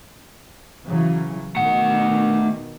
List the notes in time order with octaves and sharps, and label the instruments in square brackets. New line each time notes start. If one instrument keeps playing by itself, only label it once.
[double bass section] C#3 E3 F#3
[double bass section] B2 D#3 [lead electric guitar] A3 F#5